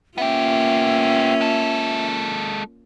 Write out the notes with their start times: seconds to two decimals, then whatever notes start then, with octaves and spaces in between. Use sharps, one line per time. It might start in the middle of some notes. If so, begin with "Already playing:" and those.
0.18 A#3 B3 C#4 F4 G4 E5
1.41 G#3 A4